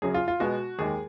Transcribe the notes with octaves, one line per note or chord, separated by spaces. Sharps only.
F#2 C#3 F#3 G#4
F4
F4
B2 G#3 B3 F#4
D#2 D#3 G#3 G#4